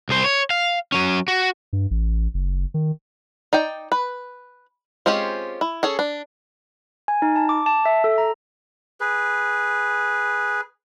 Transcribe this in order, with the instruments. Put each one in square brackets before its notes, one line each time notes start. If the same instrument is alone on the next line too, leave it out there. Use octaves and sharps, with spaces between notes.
[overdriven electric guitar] C2 C5
C#5
F5
F#3 C#4
F#4
[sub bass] G2
A1
F#1
D#3
[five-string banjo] D#4 D5 G5
B4
G#3 C4 C#4 F4 G4
E4
C#4 G#4 A4
D4
[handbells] G#5
D#4
A5
D6
A5
E5
A4
A#5
[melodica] G#4 B4